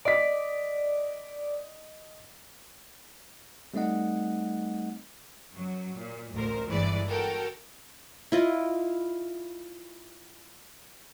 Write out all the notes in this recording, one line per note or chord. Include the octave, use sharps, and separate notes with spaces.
D5 D#5 B6
G3 A3 C4 D#4 D#5 F#5
F#2 F#3
A#2
A1 D2 A#4 C5
G1 E3 G#3 B4 D5
F#4 A4 A#4 G5
E4 F4 D#5